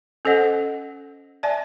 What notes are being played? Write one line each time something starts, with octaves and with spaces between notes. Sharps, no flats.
C#4 A4 C5 D#5 F#5
D5 E5 G#5 A5